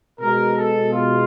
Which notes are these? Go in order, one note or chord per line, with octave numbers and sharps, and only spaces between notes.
B2 G#3 A#4
A4
F4